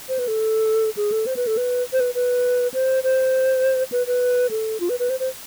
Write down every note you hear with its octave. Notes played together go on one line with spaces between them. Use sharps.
C5
B4
A4
G#4
A4
C5
B4
A4
B4
C5
B4
B4
C5
C5
B4
B4
A4
F4
B4
B4
C5
C5